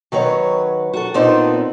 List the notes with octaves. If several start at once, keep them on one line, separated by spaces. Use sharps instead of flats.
D#3 F#3 B4 C#5
F#4 A4
A#2 B3 C4 D4 D#4 C5